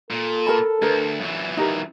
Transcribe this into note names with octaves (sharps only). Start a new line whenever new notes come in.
A#2 A4
A#4 A5 B5
D2 A#4 B4
F#2 E3
D#4 G4 A#4